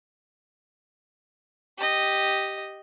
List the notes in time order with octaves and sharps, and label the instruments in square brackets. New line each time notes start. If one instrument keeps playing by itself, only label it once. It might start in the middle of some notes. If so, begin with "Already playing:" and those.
[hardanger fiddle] G4 D#5